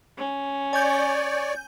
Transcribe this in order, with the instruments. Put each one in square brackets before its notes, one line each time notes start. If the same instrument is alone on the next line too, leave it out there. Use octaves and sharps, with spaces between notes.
[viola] C#4
[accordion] C#5 D5 [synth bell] G#5 G6